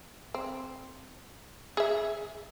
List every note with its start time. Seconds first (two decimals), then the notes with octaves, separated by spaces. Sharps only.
0.34 C4
1.77 G#4 E5